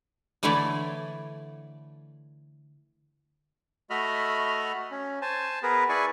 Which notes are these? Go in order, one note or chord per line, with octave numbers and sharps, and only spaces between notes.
D3 E3 A3 E4 C#5 D5
A3 F#4 D#5 E5 B5 F6
C#4
C5 G#5 A5
B3 G#4 A#4 B4
E4 G#4 B4 D5 G#5 C#6